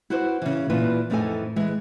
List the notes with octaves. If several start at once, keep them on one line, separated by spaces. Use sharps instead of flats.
E4 F#4 B4 C5 F#5
C#3 E3
A#2 E3 F4 B4
F2 A2 E3 D#4 A4 G#5
E3 G#3